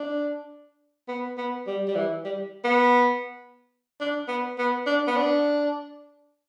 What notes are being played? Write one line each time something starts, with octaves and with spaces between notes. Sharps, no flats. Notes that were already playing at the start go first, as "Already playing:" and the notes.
Already playing: D4
B3
B3
G3
G3
E3
G3
B3
D4
B3
B3
D4
B3
D4